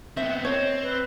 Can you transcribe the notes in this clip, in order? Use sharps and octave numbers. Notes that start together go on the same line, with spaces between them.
B3 C4 E5
C4 C#5 D#5
B4